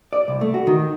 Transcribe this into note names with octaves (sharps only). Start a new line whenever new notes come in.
D5
C2
A3
F#4
D#3